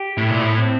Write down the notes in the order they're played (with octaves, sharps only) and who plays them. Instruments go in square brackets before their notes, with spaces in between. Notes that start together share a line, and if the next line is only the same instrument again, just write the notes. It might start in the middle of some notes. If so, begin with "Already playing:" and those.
Already playing: [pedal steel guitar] G4
[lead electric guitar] A2 [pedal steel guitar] E4
[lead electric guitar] A#2
A2
[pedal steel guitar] C4